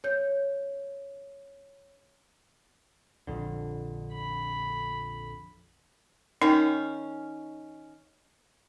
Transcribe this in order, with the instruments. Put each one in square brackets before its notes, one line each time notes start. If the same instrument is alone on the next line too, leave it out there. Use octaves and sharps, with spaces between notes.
[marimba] C#5 G6
[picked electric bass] A#1 F2 D3
[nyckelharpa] B5
[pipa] D#3 C#4 [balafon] D#4